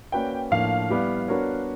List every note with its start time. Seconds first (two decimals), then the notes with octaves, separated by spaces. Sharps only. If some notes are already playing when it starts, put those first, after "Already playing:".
0.12 A#3 C#4 F#4 B4 D5 G5
0.51 A2 F3 A#3 D4 F5
0.90 G3 B3 E4 G4
1.28 B3 D4 F#4 A#4 C#5